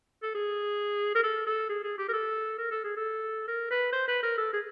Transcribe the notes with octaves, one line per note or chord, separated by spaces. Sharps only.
A4
G#4
A#4
A4
A4
G#4
G#4
G4
A#4
A4
A#4
A4
G#4
A4
A#4
B4
C5
B4
A#4
A4
G#4